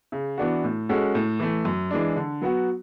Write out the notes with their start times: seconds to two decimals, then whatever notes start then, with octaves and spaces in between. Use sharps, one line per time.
0.12 C#3
0.38 E3 B3 D4 F#4
0.64 A2
0.89 G#3 C#4 F#4 A4
1.15 A2
1.40 E3 A3
1.65 F#2
1.91 E3 G#3 D4
2.16 D3
2.42 F#3 B3 F#4